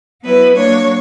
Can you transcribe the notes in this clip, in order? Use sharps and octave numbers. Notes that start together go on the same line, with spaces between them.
F#3 B3 E4 B4
F#3 A#3 D4 C#5